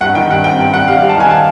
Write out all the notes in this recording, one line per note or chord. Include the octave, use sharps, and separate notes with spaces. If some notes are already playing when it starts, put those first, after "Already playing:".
G2 F#5
D#3 G5
G2 F#5
C4 G5
G2
G2 F#5
G3 F5
G3
A5
D#3 G#5
A5